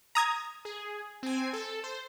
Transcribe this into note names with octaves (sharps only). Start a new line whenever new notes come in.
A#5 D#6 G#6
G#4
C4 G#5
A4
C5